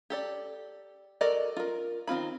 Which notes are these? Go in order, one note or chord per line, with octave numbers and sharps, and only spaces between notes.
G4 A4 D5
F#4 A4 A#4 D5 D#5
F4 A#4
D#3 C4 F4 B5